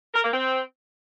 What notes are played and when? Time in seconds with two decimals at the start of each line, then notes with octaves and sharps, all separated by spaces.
0.14 A#4
0.24 A#3
0.33 C4